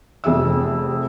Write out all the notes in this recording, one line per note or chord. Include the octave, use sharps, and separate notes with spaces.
F1 F2 G4 G#4 E5 E6